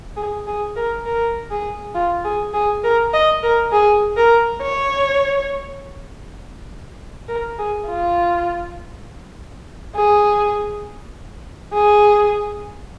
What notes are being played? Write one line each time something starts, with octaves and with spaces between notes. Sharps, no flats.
G#4
G#4
A#4
A#4
G#4
F4
G#4
G#4
A#4
D#5
A#4
G#4
A#4
C#5
A#4
G#4
F4
G#4
G#4